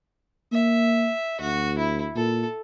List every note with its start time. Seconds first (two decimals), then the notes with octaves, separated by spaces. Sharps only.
0.52 A#3 E5
1.40 D2 F#4
1.78 E4
2.16 A#2 A4